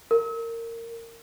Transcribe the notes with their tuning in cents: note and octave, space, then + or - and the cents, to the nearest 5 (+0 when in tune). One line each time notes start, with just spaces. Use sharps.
A#4 -20